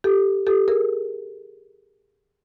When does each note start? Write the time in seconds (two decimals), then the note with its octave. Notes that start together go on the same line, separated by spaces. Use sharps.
0.04 G4 A4
0.47 G4 A4
0.68 G#4 A#4